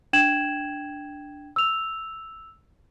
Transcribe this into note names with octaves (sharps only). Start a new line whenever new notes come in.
D4 G5 G#6 E7 F#7
E6 F7